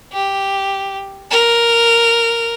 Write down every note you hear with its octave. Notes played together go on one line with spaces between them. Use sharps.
G4
A#4